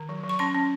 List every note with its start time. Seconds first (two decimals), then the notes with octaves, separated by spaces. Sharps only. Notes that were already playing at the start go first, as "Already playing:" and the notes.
Already playing: D#3
0.09 F#3
0.24 F#3
0.29 C#6
0.39 C#4 C6
0.54 C#4